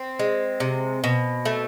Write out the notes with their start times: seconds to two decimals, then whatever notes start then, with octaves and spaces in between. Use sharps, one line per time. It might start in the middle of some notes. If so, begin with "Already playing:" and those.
Already playing: C4
0.19 G#3
0.60 C3
1.04 B2
1.45 A3